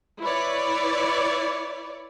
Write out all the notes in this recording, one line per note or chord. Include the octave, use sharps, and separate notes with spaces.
E4 B4 C#5 D5